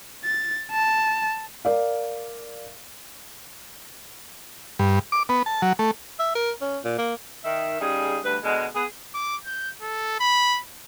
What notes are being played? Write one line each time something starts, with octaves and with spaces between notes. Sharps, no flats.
A6
A5
A#4 D5 F5
G2
D6
B3
A5
F#3
A3
E5
A#4
C#4
A#2
A#3
D#3 E5
C#3 G3 D#4 G#4
D2 G2 B4
B2 D3 G#3
B3 G#4
D6
G6
A4
B5